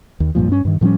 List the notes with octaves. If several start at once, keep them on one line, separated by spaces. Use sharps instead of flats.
D#2
B1 G2 A#2 F3
G2 C#4
G2 D#3
A2 F3 G3 C#4